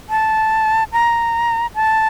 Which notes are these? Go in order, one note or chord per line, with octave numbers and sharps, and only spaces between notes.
A5
A#5
A5